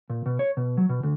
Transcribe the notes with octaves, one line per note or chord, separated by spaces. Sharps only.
A#2
B2
C#5
B2
F#3
B2
D2